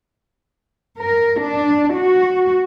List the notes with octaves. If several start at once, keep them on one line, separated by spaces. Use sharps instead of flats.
A#4
D4
F#4